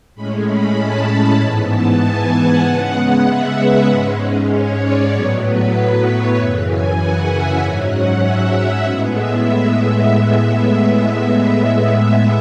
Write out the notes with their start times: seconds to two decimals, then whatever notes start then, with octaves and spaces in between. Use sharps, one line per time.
0.15 A2 G#3 C#4 B5
0.46 B5
0.77 A5
1.39 G#2 E3 B3
1.71 A5
2.01 G#5
2.32 F#5
2.63 C#3 G#3 B3 F#5
3.25 E5
3.56 B4
3.87 G#2 G#3 C#4
4.49 C#5
4.80 D5
5.11 A2 F#3 B3 C#5
5.42 B4
6.04 C#5
6.35 F#2 C#3 E3 E5
6.66 G#5
6.97 F#5
7.28 E5
7.59 G#2 F#3 C#4
7.90 F#5
8.21 E5
8.52 E5
8.82 A2 G#3 B3
9.14 E5